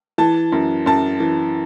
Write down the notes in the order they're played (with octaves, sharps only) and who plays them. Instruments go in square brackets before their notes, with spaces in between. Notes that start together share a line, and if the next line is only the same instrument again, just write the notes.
[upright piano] E3 A5
F#2
F#2 A5
E3